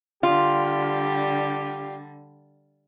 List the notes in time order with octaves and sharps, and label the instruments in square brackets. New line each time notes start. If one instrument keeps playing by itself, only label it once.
[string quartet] D3 G3 [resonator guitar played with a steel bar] F4 [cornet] G4